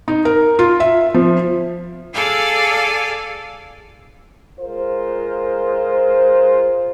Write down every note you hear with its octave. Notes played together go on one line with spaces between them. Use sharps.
D#4
A#4
F4
E5
F3
G#4 A4 D5 F5 G#5
G#3 F4 A#4 C5